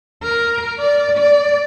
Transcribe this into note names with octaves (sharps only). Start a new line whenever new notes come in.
A#4
D5
D5